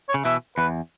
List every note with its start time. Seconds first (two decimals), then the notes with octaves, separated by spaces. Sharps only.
0.09 C#5
0.14 C#3
0.25 B2 E3 E5
0.57 E2 B4